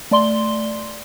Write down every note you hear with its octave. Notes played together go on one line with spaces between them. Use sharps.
A3 D5 C6 G7